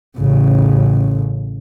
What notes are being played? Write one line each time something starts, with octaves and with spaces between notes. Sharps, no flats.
A1 C#3